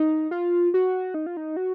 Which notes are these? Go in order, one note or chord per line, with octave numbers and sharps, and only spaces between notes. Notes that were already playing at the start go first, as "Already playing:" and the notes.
Already playing: D#4
F4
F#4
D#4
F4
D#4
F#4